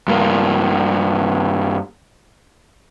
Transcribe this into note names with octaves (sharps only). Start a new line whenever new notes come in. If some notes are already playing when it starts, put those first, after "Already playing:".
G2 A#3